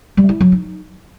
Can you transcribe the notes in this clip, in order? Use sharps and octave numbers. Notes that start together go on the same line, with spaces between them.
G3
E4
F#3
D#4